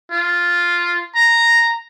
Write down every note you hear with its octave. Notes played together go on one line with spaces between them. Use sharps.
F4
A#5